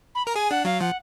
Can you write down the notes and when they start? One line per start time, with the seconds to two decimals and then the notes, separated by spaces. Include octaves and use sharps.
0.15 B5
0.25 A#4 A#5
0.35 G#4 G#5
0.51 D4 F#5
0.65 F#3 F5
0.81 F3 F#5